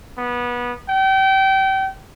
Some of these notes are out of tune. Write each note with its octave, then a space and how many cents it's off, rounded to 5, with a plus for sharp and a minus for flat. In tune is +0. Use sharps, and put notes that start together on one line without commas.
B3 -20
G5 -30